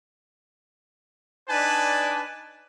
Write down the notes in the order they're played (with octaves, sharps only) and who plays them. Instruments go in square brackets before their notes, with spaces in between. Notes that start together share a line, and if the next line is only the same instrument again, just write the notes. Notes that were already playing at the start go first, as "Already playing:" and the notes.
[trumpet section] D4 D#4 B4 D5 G#5 A5